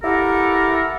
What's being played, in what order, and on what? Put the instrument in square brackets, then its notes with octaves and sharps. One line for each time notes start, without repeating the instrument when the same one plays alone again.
[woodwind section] E4 G4 A4 A#4 F#5